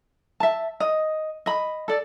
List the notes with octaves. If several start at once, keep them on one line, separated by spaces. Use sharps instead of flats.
E5 A5
D#5
D#5 B5
A4 D5